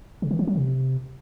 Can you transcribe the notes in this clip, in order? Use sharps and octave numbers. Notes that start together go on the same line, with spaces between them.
C#3
D#3
F3
F#3
C3